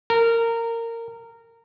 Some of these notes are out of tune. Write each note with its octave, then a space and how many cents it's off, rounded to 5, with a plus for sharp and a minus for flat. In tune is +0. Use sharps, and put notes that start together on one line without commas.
A#4 -20